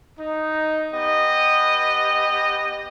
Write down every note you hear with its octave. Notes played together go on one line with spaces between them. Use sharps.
D#4
B3 G4 D#5